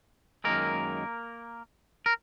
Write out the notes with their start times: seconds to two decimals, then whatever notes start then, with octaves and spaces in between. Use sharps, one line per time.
0.44 F#2 D#3 G#3 A#3 A#4
2.06 A#4